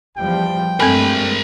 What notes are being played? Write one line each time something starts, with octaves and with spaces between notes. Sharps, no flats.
E2 F3 G3 G5
G2 G#3 A3 C4 A4 A#4 G#5 B5